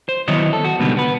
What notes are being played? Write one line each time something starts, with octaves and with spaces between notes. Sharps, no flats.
C5
D#3 F#3 B3 E4 C#5 D#5
A4
F#4
C#2 B2 D3 D#3 G3 B3
B3 B4